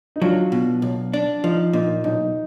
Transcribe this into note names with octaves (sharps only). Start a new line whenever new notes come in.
D#4
F#3 D4 F4
B2
B1
D4
F3 D#4
A#2 D#4
B1 D#4